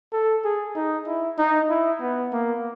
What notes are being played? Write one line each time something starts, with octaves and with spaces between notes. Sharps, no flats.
A4
G#4
D#4
E4
D#4
E4
B3
A#3